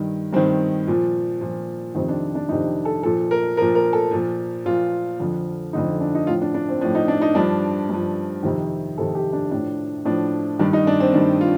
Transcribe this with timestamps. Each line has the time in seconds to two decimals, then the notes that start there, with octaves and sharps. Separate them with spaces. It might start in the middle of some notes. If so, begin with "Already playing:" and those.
Already playing: G2 D#3
0.33 G2 D#3 C4
0.87 A#2 F3
1.41 A#2 F3
1.95 F2 C3 D#3 C4
2.09 D4
2.35 D4
2.49 F2 C3 D#3 D#4
2.85 A4
3.03 A#2 F3 A4
3.31 A#4
3.57 A#2 F3 A#4
3.75 A#4
3.93 A4
4.11 A#2 F3
4.65 A#2 F3 F4
5.19 F2 D3 F3
5.73 F2 D3 F3 D#4
6.01 D4
6.15 D#4
6.27 A2 F3 F4
6.42 D4
6.54 D4
6.69 C4
6.81 F3 D4
6.85 A2
6.95 D#4
7.08 D4
7.22 D#4
7.35 G2 F3 D4
7.89 G2 F3
8.43 F2 C3 D#3
8.98 F2 C3 D#3 A4
9.15 G4
9.33 D4
9.51 A2 F3 D4
10.05 A2 F3 D4
10.59 G2 D#3 D4
10.73 D#4
10.87 D4
11.00 C4
11.13 G2 D#3 D4
11.41 F4